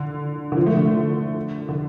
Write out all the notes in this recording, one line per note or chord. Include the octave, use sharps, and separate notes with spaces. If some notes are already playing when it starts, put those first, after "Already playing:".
Already playing: D3
D3
F3
A3
D3
D3